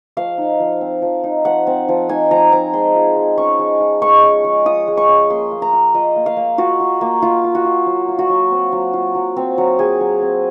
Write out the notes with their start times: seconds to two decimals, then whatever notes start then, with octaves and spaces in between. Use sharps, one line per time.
0.17 F3 F5
0.38 D#4
0.60 F3
0.81 C4
1.02 F3
1.24 D#4
1.45 F3 F#5
1.67 C4
1.88 F3
2.09 D#4 G#5
2.31 F3 A#5
2.52 C4 A#5
2.73 G#3 C6
2.95 F4
3.16 G#3
3.37 C#4 C#6
3.59 G#3
3.80 F4
4.02 G#3 C#6
4.23 C#4
4.44 G#3
4.66 F4 D#6
4.88 G#3
4.97 C#6
5.08 C#4
5.30 A#3 C6
5.51 A#3
5.62 A#5
5.73 F4
5.95 F4 D#5
6.16 A#3
6.26 F5
6.37 A#3
6.58 F4 F#4
6.80 F4
7.01 A#3
7.22 A#3 F4
7.44 F4
7.55 F#4
7.65 F4
7.86 F#3
8.08 F4
8.19 F#4
8.29 F#3
8.51 C4
8.72 F#3
8.93 F4
9.15 F#3
9.36 C4
9.58 F#3
9.79 F4 G#4
10.01 F#3
10.22 C4